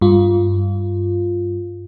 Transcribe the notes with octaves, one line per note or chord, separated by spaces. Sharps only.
G2 F4